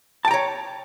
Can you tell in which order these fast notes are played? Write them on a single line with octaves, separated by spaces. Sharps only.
A5 G5 A#5 C#5